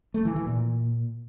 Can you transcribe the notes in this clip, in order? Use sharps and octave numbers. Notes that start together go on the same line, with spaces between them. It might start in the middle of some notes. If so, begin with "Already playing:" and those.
A3
E3
E3
A#2